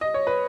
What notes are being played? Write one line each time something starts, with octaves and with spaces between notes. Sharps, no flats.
D#5
C#5
B4